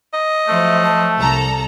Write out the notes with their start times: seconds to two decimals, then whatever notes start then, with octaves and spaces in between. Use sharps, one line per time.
0.13 D#5
0.47 F3 F#3 A3 C5 E5
0.82 A5
1.18 C2 A4 A#5